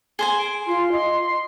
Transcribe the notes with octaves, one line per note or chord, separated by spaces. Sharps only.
G#4 C5 G#5 G7
D7
F4 C6
D#5 C6
C6